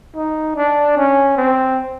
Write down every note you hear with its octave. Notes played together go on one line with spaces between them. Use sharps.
D#4
D4
C#4
C4